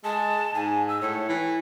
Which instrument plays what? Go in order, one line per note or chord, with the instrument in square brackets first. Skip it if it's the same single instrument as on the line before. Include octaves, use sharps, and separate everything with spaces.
[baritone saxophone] G#3 [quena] A5
[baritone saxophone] G#2 [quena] G#5
[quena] E6
[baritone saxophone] A2 [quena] C#5
[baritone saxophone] E3